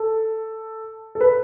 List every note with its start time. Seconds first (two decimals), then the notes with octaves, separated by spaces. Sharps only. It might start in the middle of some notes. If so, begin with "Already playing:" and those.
Already playing: A4
1.15 A4
1.21 B4